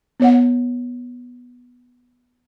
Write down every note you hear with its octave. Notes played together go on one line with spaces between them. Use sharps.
B3 C#5 F#5